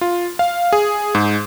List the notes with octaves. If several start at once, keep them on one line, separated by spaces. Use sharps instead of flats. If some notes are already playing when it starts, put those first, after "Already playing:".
F4
F5
G#4
G#2